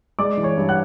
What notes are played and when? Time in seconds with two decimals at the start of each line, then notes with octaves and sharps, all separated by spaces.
0.19 G#3 D5 D6
0.37 E3
0.43 C#5 C#6
0.56 G2
0.69 F#5 F#6